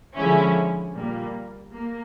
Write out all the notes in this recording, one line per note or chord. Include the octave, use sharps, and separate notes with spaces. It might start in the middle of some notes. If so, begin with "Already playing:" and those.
D3 F3 G#3 C#4 E4
A#2 G3 A#3
A#3